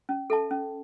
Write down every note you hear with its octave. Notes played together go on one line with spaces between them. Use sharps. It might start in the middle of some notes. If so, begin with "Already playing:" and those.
C#4
A4 E5 A5
C#4